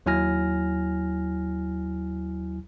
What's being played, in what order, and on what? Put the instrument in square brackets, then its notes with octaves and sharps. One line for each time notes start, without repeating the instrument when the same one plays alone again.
[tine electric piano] D#2 F#3 E4 G#5 F6 A#6